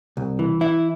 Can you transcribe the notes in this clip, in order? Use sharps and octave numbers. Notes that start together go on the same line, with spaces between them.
C2
E3
E3 E4